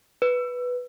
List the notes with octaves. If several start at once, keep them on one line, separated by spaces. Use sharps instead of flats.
B4